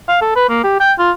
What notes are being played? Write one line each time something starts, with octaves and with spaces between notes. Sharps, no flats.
F5
A4
B4
A#3
G4
G5
F4